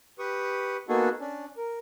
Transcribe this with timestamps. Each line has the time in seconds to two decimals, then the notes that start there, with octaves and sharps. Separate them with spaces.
0.19 G4 B4 C#6 D#6
0.88 A#3 B3 D#4 F#4 G#4 A4
1.20 C#4 D4
1.57 A#4